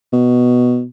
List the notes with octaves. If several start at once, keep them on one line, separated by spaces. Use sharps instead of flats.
B2